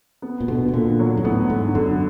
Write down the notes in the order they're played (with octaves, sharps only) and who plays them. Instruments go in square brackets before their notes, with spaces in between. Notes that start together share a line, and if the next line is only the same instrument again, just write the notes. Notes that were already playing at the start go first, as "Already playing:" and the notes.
[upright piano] B3
[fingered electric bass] A#2
[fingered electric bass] B2 [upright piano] D3
[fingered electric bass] B2
[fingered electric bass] A#2 [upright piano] D3
[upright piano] F#3
[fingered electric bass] G#2
[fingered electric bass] A2 [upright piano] B3
[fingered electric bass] G#2 [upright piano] D3
[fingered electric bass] F#2 [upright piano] D3